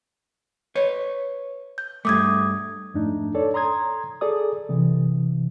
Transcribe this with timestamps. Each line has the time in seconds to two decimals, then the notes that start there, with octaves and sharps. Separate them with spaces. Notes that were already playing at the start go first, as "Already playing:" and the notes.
0.75 B4 C#5
1.78 G6
2.05 G2 A3 D6 D#6 G#6
2.94 F2 G#2 A3 D4 D#4
3.35 A4 C#5 D5
3.54 A#5 C6 D#6 G#6
4.21 G#4 A4 D5 D#6
4.69 C3 E3